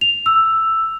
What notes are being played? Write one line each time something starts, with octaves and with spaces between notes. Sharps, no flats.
F7
E6